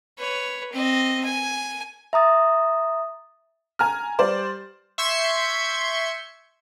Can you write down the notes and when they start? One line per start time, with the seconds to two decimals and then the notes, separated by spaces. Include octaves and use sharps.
0.18 B4 C#5
0.73 C4 D#5
1.25 G#5
2.13 E5 A#5 D#6 A6
3.79 G#5 A#5 F6
4.19 G3 C5 D5
4.98 E5 C6 C#6 G6 G#6 C#7